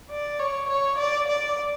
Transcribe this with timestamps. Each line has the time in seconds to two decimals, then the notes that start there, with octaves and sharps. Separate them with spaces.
0.10 D5
0.39 C#5
0.69 C#5
0.98 D5
1.27 D5